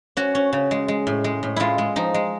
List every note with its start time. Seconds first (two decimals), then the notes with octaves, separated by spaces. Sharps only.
0.17 C#4 F#4
0.35 C#4
0.53 C#3
0.71 G#3
0.88 G#3
1.07 A2
1.24 G#3
1.43 A2
1.56 G#3 E4 F4
1.78 G#3
1.96 F3 D#4
2.14 G#3